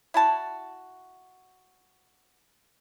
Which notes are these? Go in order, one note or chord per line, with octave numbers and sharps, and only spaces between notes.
E4 F#4 A5